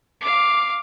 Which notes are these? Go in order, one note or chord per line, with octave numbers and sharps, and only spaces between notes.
F5 D6